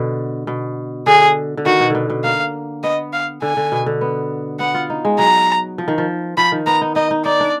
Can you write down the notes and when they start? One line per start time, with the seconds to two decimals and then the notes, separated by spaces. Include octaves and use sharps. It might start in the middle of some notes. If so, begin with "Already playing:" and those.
Already playing: B2 D3
0.47 B2
1.06 D3 G#4
1.57 D3
1.66 D#3 F#4
1.80 B2
1.90 B2 D3
2.10 B2
2.24 A#3 F5
2.83 B3 D#5
3.13 F5
3.42 D3 G#5
3.57 D3
3.72 B2
3.86 D3
4.01 B3
4.60 B3 F#5
4.75 F4
4.90 D#4
5.05 G#3
5.19 F#3 A#5
5.78 F3
5.88 D#3
5.98 F3
6.37 F3 B5
6.52 D#3
6.66 B3 A#5
6.81 D#4
6.95 D#4 D#5
7.11 D#4
7.25 D#4 D5
7.40 D4